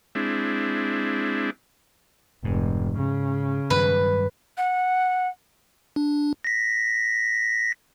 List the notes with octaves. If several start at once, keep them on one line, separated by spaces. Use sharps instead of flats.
G#3 C4 D4 E4
F1 G#2
C#3
G2 D#3 F#3 B4
F#5
D4
A#6 B6